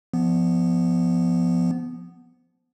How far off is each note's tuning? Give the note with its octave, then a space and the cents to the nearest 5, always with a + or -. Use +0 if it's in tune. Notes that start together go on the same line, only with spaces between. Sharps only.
F3 -5 B3 +0